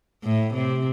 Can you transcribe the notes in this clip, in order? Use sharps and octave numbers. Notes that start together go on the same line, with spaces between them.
A2
C3